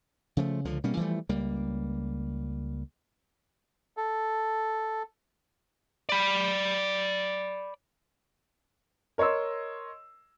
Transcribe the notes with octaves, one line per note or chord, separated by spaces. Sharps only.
C#3 F3 A3
C#2 D3 F3
B2 G3 A#3 C#4
E3 F3 G3 A3
C#2 G3 A#3
A4
D5 B5
A#4 C#5 D#5 C6 E6